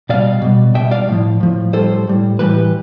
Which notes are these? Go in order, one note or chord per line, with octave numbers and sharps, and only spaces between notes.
B2 G3 D5 F5
B2 G3
B2 E5 G5
G3
D5 F5
A2 F3
A2 F3
A2 G3 A4 C5
A2 G3
A2 E3 G3 G4 B4